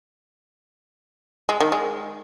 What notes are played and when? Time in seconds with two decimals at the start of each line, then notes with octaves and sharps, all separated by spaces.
1.49 G#3
1.60 D#3
1.72 G#3